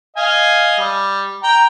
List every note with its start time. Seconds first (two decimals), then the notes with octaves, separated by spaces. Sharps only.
0.17 D#5 F5 G#5
0.79 G3
1.43 G5 A#5